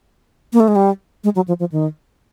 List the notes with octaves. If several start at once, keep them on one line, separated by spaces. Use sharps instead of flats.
A#3
A3
G#3
G3
G#3
F#3
F3
F3
D#3